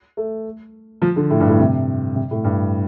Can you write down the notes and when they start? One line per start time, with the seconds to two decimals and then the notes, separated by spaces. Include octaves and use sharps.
0.17 A3
1.02 F3
1.16 D3
1.30 A2
1.40 G2
1.48 A2
1.59 C3
2.16 C3
2.31 A2
2.44 G2